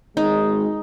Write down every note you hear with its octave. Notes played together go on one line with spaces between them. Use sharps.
G#1 G#3 D#4